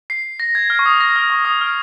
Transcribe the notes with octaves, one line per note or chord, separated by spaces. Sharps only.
C7
A#6
G#6
F6
C#6
D#6
A#6
F6
C#6
D#6
F6